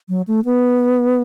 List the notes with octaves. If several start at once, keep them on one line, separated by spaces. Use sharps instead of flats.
F#3
A3
B3